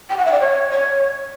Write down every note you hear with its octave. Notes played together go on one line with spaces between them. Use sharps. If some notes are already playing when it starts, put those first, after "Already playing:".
G5
F#5
E5
D5
C#5
C#5